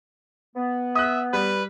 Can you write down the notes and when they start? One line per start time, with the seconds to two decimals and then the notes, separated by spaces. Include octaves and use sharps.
0.56 B3
0.95 E5 D#6 F#6
1.33 G3 B4